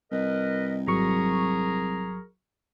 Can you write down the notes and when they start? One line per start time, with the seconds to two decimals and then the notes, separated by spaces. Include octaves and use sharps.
0.12 C2 A#4 B4 D#5
0.88 G#1 F#3 G#4 A#4 A#5 C#6